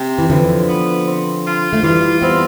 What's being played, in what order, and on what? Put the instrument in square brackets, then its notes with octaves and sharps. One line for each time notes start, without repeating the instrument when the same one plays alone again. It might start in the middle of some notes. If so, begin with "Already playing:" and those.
Already playing: [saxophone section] C3
[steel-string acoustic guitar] E3
[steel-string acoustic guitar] D3 F3 [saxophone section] E3
[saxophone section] B3
C4
F4
[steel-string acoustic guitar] A3
[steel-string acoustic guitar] E3 G3 [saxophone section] F4
[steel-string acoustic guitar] G3 B3 [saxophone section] C4